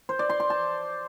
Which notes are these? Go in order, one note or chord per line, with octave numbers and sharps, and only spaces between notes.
C5
D5
C6
C6
A5